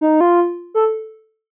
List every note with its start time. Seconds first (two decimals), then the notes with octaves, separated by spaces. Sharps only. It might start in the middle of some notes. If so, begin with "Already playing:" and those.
0.01 D#4
0.21 F4
0.74 A4